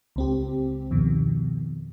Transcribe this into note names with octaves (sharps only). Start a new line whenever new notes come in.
C#2 C4 G4
F2 B2 D#3